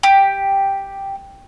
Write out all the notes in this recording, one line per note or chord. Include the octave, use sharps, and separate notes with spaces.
G4